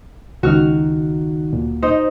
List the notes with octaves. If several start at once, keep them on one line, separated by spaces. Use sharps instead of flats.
C#2 D#3 D#4 F#4 F6
D2 A#2
D#4 C5